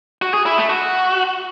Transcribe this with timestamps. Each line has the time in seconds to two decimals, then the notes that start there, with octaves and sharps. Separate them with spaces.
0.22 F#4
0.34 G#4
0.46 E4
0.58 A3
0.70 F#4